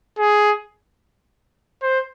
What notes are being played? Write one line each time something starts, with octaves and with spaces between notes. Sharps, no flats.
G#4
C5